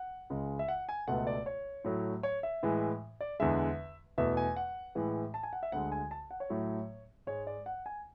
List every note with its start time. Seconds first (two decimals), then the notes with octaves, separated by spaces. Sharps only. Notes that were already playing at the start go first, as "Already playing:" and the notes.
Already playing: F#5
0.30 C#2 C#3 G#3
0.59 E5
0.68 F#5
0.89 G#5
1.08 C#2 B2 A3 F#5
1.27 D5
1.46 C#5
1.84 A2 F#3 A3
2.23 C#5
2.43 E5
2.63 A2 E3 G#3
3.21 D5
3.40 E2 D3 G#3 E5
4.18 E2 B2 A3 E5
4.37 G#5
4.56 F#5
4.95 A2 E3 G#3
5.34 A5
5.43 G#5
5.53 F#5
5.63 E5
5.72 D2 D3 G#3 F#5
5.92 G#5
6.11 A5
6.31 F#5
6.40 C#5
6.50 A2 F#3 A3
7.27 G#2 G#3 C#5
7.47 D5
7.66 F#5
7.86 G#5